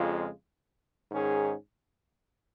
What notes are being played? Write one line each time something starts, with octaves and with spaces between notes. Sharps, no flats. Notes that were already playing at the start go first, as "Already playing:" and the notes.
Already playing: F2 C#3 G#3 F4
G#2 D#3 C#4 G#4